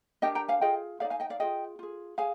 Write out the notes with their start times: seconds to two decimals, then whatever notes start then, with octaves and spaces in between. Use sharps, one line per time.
0.22 D4 G4 A#4 D#5 G5
0.35 G5 A#5
0.48 F5 G#5
0.61 F4 G#4 D#5 G5
1.00 G#4 D5 F5
1.04 D#4
1.10 F5 G#5
1.20 D#5 G5
1.30 D5 F5
1.40 F4 G#4 D#5 G5
1.79 F4 G#4
2.18 G#4 F5 G#5